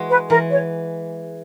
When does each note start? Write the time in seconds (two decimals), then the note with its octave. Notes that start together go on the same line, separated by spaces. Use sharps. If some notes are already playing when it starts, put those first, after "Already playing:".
Already playing: E3 G#3 F#4
0.09 B4
0.29 E3 A#4
0.50 C#5